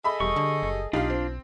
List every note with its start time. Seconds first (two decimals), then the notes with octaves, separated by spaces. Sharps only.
0.04 G#4 A4 D#5 E5 B5
0.20 E1 G3 C#6
0.36 D3
0.63 F#1
0.93 B1 D4 D#4 F4 G4 F5
1.10 C4